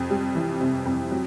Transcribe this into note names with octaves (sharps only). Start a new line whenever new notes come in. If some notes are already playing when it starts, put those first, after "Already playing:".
Already playing: F2 C3
G3
E3
C3
F2
F#3